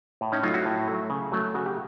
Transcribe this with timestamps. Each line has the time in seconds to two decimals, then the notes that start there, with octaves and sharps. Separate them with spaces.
0.21 A2
0.32 C#4 D#4
0.43 F#3 A3 D#4 F4
0.54 E4 F#4
0.65 A2
0.88 F#3 A3
1.10 C#3
1.32 F#3 A3
1.54 C#3 F#4
1.66 G4